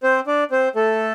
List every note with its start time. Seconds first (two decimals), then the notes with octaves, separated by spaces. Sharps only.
0.03 C4 C5
0.27 D4 D5
0.51 C4 C5
0.75 A3 A4